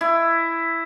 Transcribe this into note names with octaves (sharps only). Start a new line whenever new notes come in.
E4